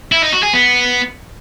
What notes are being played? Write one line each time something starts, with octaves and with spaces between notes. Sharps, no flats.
E4
D#4
F#4
G#4
B3